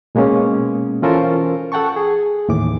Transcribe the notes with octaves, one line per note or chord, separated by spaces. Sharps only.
B2 G#3 A#3 B3 C#4
E3 C#4 F4 A4 A#4 C5
A4 F#5 G5 A5 C#6
G#4
D#2 A2 E3 D6